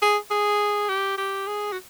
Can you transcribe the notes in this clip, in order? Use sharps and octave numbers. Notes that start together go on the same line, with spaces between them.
G#4
G#4
G4
G4
G#4
F#4